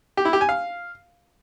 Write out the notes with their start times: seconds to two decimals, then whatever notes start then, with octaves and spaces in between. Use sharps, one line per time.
0.17 G4
0.25 E4
0.33 G4
0.41 G#5
0.49 F5